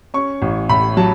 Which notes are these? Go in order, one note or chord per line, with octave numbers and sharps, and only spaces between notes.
C#4 C#6
A1
A2 B5
F#3 A5